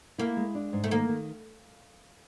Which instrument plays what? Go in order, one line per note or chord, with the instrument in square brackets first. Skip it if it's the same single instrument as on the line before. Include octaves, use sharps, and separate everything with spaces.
[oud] A#3 [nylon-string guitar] E4
[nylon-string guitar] G#3
D4
G#2
[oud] A3
[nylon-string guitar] D#3 [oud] A#3
[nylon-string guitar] D#3